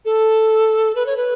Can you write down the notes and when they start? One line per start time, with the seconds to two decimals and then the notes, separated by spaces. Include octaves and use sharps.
0.05 A4
0.95 B4
1.06 C#5
1.17 B4